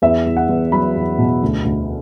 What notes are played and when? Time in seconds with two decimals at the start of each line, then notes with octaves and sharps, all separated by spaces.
0.02 E2 E5
0.26 E2
0.37 F#5
0.49 E2
0.72 F#3 B5
0.96 E2
1.19 B2
1.42 D2
1.65 D2